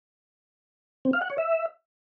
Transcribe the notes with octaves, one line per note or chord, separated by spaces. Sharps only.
C4
F5
F#5
C#5
E5